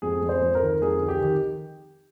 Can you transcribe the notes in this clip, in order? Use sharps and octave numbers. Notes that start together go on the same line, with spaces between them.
F2 G#4
F2
C5
F2
A#4
D#3
F2 G#4
D#3
G4
D#3